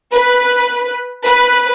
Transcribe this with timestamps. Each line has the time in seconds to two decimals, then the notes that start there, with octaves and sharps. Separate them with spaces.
0.12 B4
1.24 B4